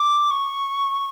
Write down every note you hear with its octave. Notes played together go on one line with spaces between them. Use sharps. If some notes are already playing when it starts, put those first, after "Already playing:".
Already playing: D6
C#6